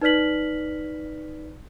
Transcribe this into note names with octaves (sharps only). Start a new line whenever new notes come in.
D#4 B4 D5 F6 B6 F#7